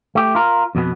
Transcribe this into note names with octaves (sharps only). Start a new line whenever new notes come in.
A3 G4
F4 A#4
F2 B2 B3